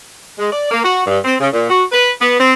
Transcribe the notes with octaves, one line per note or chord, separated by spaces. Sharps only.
G#3
D5
A#3
F#4
G2
C4
C#3
A#2
F#4
B4
B3
C4